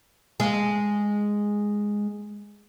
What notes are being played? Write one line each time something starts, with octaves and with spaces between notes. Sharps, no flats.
G#3 G#4